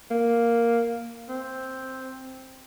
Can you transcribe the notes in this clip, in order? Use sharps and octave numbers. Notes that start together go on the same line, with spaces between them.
A#3
C4